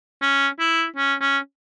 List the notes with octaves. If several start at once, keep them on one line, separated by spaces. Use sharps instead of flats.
C#4
E4
C#4
C#4